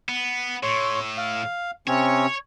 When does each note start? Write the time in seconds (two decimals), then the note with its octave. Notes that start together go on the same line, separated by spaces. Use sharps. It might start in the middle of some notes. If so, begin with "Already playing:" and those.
0.09 B3
0.63 A2 C#5 C6
1.18 F5
1.88 C3 C4 C#4 C#5